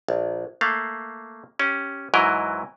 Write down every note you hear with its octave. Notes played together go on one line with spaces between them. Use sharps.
A#1
A3 A#3 F5
C#4 G4
G#2 E3 F#3 E4 A#4 D#5